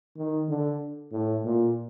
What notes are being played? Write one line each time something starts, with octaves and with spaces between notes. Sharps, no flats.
D#3
D3
A2
A#2